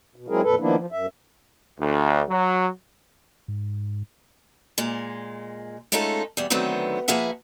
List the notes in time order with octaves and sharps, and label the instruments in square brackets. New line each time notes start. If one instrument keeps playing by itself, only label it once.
[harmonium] B2
F#3 G#3 C4 E4 G#4 A#4
F2 A#2 A4 B4
D#3 F3 A#3 B3 D4 E4
F3
F#2 E5
[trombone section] D2
F#3
[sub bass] G#2
[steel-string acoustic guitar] A#2 G#3
G#3 A3 C#4 D#4 F4 A4
E2 G3
D3 D#3 F#3 A3 B3 C4
F3 A#3 G#4 B4 E5 F#5